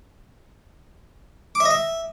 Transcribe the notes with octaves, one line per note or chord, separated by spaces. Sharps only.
D6
E5
D#5
E5